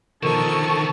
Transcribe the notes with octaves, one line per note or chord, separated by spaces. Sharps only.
B2 D3 D#3 F3 A4 A#4 A5 C#6